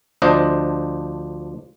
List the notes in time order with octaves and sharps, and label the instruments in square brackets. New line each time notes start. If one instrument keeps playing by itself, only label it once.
[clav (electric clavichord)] D2 F3 D4 C5 D#5